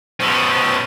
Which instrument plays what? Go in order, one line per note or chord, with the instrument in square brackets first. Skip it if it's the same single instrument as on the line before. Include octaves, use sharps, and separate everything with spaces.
[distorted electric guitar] B2 C#4 [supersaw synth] C5 A5 E6